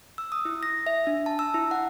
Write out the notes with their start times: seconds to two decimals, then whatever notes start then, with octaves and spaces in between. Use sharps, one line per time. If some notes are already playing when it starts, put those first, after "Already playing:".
0.18 E6
0.32 D#6
0.45 E4
0.63 A#6
0.86 E5
1.07 D4
1.26 A5
1.39 E6
1.54 E4
1.71 F#5